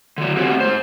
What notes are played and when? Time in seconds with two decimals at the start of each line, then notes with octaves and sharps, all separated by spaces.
0.18 D3 F#3
0.37 A3 C4 F#4 G4 F#5
0.60 G#2 C5